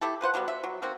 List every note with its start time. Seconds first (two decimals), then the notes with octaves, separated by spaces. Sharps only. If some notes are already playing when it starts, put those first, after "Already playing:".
0.01 A3 E4 G4 A4
0.21 F3 B4 C5 F#5
0.34 E3 F#3 G3 B3
0.48 E5
0.64 F#3
0.82 D#3 A#3 C4 F#4